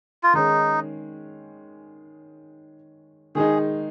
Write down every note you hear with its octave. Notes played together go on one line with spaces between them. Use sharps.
F4
D#3 G#3 C#4 D#4
D#3 G#3 D#4 G#4